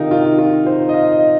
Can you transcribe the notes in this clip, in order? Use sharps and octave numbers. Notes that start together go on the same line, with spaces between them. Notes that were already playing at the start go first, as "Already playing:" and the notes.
Already playing: C3 D#3 D#4 F4 A#4
F4
F4
C5
D#5
F5
D#5